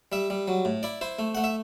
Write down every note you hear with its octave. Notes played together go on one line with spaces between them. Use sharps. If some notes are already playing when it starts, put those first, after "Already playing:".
G3 E5
G3
F#3
A2
E4 D5
E4 C5
A3
A3 F#5
E5